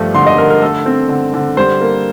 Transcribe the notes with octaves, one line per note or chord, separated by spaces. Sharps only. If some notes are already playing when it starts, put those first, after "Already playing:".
Already playing: G2 F3 A3
D3 C6
D#5
D3 A#4
A#4
A3 A4
C4
D3
D3
G3 C5
A#3